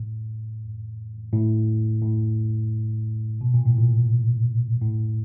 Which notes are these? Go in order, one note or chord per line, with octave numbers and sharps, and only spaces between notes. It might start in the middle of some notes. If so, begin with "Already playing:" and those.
Already playing: A2
A2
A2
B2
A#2
A2
A#2
A2